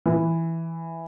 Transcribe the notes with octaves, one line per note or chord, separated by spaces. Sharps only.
E3